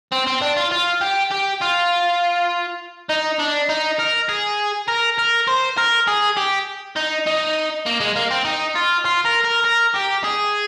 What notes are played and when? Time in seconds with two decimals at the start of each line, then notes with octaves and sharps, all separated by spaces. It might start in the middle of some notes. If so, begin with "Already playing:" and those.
0.12 C4
0.27 C4
0.42 D4
0.57 F4
0.72 F4
1.01 G4
1.31 G4
1.61 F4
3.10 D#4
3.39 D4
3.69 D#4
3.99 A#4
4.29 G#4
4.88 A#4
5.18 A#4
5.47 C5
5.77 A#4
6.07 G#4
6.37 G4
6.96 D#4
7.26 D#4
7.86 A#3
8.00 G#3
8.16 A#3
8.31 C4
8.45 D#4
8.75 F4
9.05 F4
9.25 A#4
9.44 A#4
9.64 A#4
9.94 G4
10.24 G#4